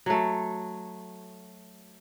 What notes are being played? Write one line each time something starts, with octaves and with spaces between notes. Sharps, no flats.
F#3 A3